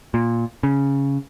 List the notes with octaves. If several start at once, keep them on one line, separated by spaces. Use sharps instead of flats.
A#2
C#3